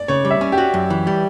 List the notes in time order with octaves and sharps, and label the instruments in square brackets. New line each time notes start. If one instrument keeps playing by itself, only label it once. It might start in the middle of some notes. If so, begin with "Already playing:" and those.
Already playing: [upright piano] D5
[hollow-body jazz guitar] C#3 [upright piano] C#5
[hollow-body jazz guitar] G3
[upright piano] E5
[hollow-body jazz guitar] C#4
[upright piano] G4
[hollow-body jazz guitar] F#4
F#2
E3
G3